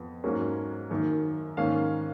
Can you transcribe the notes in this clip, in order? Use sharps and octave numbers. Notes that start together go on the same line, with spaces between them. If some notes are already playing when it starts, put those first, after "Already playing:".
Already playing: F2 B3
G#2 F#3 A#3 C#4
F#2 D#3 A#3
G#2 D#3 A#3 C#4 F5